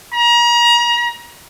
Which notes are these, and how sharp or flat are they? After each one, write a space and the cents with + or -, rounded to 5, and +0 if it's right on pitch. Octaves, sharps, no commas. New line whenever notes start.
A#5 +35